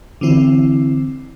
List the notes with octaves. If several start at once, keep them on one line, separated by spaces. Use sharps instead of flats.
D3 E3 C4 E4